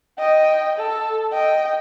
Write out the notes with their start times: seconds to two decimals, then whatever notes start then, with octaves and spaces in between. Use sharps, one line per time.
0.19 D#5 G5
0.79 A4
1.33 D#5 G5